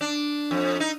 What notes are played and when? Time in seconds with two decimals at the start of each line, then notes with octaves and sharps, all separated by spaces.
0.01 D4
0.51 F2
0.80 D#4